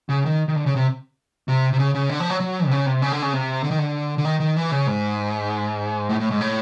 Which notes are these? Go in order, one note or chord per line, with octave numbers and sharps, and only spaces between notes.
C#3
D#3
D#3
D3
C#3
C3
C3
C3
C#3
C#3
D3
F3
F#3
F#3
C3
C#3
C3
C#3
D3
C#3
C3
D3
D#3
D3
D3
D#3
D#3
E3
C#3
G#2
A2
A2
G#2
A2